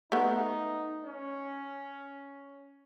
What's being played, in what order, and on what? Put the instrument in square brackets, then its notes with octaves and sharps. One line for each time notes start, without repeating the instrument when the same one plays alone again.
[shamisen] A3 B3 [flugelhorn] D#4
[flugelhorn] C#4